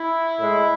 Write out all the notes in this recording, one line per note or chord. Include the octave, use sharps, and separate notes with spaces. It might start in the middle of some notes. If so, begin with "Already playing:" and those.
Already playing: E4
A2 G#3